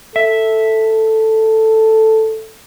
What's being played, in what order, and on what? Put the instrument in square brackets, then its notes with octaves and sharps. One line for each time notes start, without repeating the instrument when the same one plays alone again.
[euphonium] A4 [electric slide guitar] E5